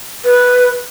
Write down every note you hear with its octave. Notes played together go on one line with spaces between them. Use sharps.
B4